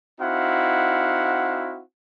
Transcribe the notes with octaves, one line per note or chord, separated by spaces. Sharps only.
C4 D#4 E4 F#4 F5 F#5